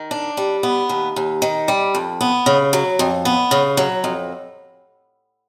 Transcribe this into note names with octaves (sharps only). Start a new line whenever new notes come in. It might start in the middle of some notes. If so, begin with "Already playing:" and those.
Already playing: D#3
D4
G3
B3
D#2
D#2
D#3
G3
F2
B3
C#3
F#3
F2
B3
C#3
F#3
F2